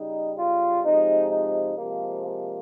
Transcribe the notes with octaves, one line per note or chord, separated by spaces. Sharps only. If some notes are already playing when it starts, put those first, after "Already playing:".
Already playing: C#3 G3 D#4
F4
C3 F3 G#3 D#4
D#4
C3 F3 G#3 A#3
A#3